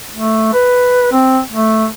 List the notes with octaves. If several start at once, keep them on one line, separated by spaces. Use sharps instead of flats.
A3
B4
C4
A3